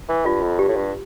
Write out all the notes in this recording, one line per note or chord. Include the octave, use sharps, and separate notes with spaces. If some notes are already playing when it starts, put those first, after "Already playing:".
E3
G2 F4
F2
G2 G4
A2
G2